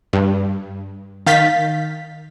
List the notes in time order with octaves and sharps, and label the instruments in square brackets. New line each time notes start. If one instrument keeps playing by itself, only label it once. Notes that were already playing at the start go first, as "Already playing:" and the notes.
[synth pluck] G2
D#3 F5 G6 A6 B6